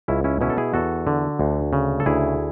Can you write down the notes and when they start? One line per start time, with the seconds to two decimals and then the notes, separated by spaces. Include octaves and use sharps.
0.08 C#2 C#4 E4
0.24 C#4 E4
0.41 B2 C#4 E4
0.50 A4
0.57 E4 G#4
0.74 E2 F#4 A4
1.07 D3
1.39 D2
1.73 C#3
2.00 A4
2.06 D2 E4 G#4